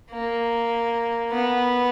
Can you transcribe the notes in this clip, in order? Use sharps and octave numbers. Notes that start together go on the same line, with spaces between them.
A#3
B3